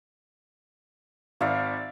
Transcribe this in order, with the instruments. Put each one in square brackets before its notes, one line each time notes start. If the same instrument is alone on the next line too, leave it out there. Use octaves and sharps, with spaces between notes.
[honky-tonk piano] G#1 D#3 [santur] D5 E5 F5